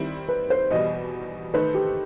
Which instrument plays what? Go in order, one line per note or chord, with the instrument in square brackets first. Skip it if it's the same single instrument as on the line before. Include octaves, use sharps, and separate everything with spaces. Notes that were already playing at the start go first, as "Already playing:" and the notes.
Already playing: [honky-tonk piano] D#3 G3 C4 E4
[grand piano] B4
C5
[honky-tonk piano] E2 B2 G3 [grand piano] D#5
[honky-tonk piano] D#3 A3 D#4 A4 C5 [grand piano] B4
[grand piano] G4